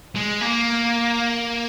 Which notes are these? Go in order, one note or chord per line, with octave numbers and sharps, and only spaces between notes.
G#3
A#3